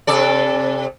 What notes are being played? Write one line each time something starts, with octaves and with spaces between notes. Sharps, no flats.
C3 A4 D5